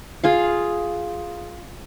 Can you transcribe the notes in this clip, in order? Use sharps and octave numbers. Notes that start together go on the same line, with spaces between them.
F4 G#4 F5